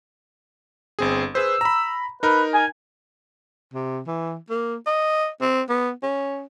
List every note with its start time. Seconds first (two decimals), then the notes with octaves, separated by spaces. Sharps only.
0.99 G1 C4 G#4
1.35 G#4 B4 C5 E6
1.61 A#5 B5
2.23 D#4 A#4 B4
2.54 G#5
3.74 C3
4.07 E3
4.50 A#3
4.86 D#5
5.41 C4
5.69 B3
6.03 C#4